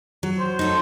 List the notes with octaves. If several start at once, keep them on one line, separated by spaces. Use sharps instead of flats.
F#3
C5
D#4 A4 C#5